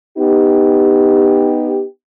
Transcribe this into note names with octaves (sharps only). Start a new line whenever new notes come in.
B3 D#4 G4